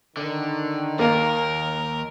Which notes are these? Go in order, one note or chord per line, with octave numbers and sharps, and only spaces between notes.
D3 D#3
D#2 A#3 A#4